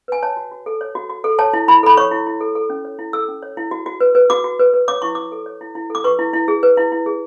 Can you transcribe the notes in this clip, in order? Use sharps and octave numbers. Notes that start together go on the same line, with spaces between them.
B4 G#5
C#5 A5
F#4
F#4
A4
C#5
F#4
F#4
A4
C#5 A5
E4
E4 B5
A4 B5
C#5 C#6
E4
E4
A4
A4
C#4
C#5
E4
A4 E6
C#4
C#5
E4
F#4
F#4
B4
B4
F#4 D6
F#4
B4
B4
C#5 D6
E4 C#6
E4 D6
A4
C#5
E4
E4
A4 D6
B4 C#6
E4
E4
G#4
B4
E4
E4
G#4